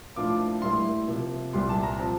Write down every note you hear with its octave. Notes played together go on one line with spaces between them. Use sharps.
A2 F3 A#3 D4 F4 D6
A2 G3 A#3 E4 C6
C3 F3 A#3
C2 A#2 G3 C6
A5
A#5
F3 C4 A5